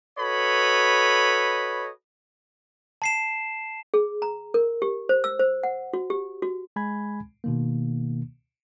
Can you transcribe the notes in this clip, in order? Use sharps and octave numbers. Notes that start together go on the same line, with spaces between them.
F#4 A4 B4 C#5 D#5 B5
A5 C7 E7
G#4
A#5
A#4
G4
C5
E6
C5
F#5
F#4
G4
F#4
G#3 G#5 B5 G#6
B2 D#3 A#3